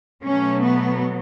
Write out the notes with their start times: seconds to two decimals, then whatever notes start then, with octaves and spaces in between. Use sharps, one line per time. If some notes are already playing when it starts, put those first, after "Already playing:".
0.23 B2 F#3 A3 C#4
0.61 B3